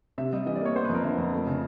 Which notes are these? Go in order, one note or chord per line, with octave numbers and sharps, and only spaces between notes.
C3 E5
G3 D#5
E3 D#5
D5
A#3 C#5
B3 C5
B4
F2
A#4
D3 E5
F2
A3
C#3